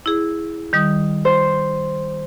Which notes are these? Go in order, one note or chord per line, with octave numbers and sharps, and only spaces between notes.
E4 G#4
D#3 G3 D#6
C5